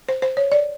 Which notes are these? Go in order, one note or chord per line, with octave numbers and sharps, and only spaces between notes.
C5
C5
C#5
D5